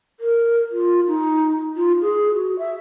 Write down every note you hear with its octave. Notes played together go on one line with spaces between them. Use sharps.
A#4
F4
D#4
F4
G#4
F#4
E5